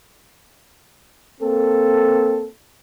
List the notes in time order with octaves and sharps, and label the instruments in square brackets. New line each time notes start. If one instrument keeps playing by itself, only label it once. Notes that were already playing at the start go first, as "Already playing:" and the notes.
[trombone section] A#3 C4 A4